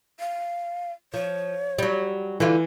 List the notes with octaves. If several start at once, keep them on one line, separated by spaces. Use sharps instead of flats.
F5
F3 C#5
F#3 G3
D3 E3 E4 F4